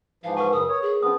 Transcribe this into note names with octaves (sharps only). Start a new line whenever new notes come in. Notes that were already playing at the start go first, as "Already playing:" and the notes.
G#2 E3 F3 F5
B4 F#5 A5 C#6
F#2 C#3 A#4 D#6
C#5 B5
G#4
F3 B3 C#4 B4 D#6